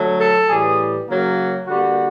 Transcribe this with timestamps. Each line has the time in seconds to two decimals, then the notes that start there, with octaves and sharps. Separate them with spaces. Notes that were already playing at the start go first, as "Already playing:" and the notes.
Already playing: D3 F#3 A3
0.19 A4
0.49 A2 E3 G3 G#4
1.08 C#3 F#3 A#3
1.68 D3 G3 A#3 F#4